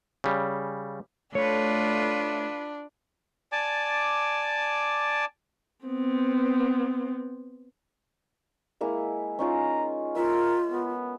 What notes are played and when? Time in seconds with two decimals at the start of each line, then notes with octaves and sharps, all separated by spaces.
0.24 C#3 G3
1.35 A3 D4 F4 B4 C#5
3.52 D5 G#5 A5 D6
5.86 B3 C4
8.81 G#3 A#3 E4
9.39 C#4 D#4 F4 A#5
10.16 F4 A#4 E5
10.72 B3